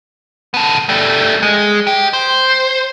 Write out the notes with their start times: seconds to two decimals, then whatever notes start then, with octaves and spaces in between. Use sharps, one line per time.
0.54 B3 A4
0.89 G3 A3
1.42 G#3
1.87 G4
2.13 C5